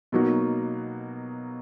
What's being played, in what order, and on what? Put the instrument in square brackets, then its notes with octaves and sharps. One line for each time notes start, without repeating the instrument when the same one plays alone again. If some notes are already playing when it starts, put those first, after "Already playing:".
[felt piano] B2 F#3 A#3 D#4 F#4